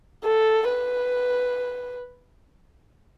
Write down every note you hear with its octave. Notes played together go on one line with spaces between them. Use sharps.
A4
B4